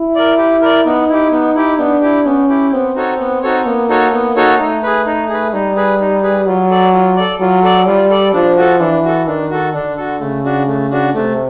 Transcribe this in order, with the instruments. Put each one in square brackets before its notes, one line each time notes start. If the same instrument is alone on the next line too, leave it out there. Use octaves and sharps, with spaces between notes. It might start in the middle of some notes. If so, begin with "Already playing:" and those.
Already playing: [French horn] E4
[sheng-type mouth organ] A#4 D5
G4
A#4 D5
[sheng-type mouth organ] B3 [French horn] D#4
[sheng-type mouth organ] E4 G4
B3
E4 G4
[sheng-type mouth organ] B3 [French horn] D4
[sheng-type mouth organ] E4 G4
[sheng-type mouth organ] B3 [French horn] C#4
[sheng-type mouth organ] E4 G4
[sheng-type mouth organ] B3 [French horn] C4
[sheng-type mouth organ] D#4 F#4 A4 C#5
B3
D#4 F#4 A4 C#5
[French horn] A#3 [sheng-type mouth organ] B3
[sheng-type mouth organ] D#4 F#4 A4 C#5
B3
D#4 F#4 A4 C#5
[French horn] A3 [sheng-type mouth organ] D#4
[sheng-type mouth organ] G#4 B4
D#4
G#4 B4
[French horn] G3 [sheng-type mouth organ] D#4
[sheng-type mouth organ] G#4 B4
D#4
G#4 B4
[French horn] F#3 [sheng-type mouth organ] F4
[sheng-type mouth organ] A4 D5
F4
A4 D5
[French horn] F#3 [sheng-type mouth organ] F4
[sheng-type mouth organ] A4 D5
[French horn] G3 [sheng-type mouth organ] F4
[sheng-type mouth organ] A4 D5
[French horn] F3 [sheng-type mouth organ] D4
[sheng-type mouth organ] F#4 A4
[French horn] E3 [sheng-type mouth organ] D4
[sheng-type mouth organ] F#4 A4
[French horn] D#3 [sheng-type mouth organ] D4
[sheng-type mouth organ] F#4 A4
[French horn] D3 [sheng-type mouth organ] D4
[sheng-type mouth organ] F#4 A4
[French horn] C#3 [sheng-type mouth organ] A3
[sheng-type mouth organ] D4 F#4
A3
D4 F#4
[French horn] C3 [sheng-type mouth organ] A3